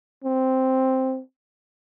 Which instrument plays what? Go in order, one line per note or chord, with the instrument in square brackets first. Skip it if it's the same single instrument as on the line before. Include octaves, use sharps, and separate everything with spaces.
[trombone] C4